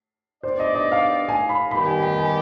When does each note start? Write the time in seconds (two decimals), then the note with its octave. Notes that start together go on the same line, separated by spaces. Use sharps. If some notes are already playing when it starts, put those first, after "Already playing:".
0.43 B3 D4 G4 C5 D5
0.60 D#5
0.75 D#5
0.92 F5
1.29 G#5
1.49 B5
1.71 D#3 G3 B3 D#4 G4 B5
1.86 G#5
2.03 G5
2.18 G#5